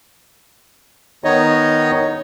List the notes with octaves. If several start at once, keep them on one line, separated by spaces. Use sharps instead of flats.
D#3 B3 D#4 C#5 D#5